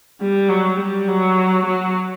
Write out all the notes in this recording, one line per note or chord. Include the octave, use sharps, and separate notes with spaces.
G3
F#3
G3
F#3
F#3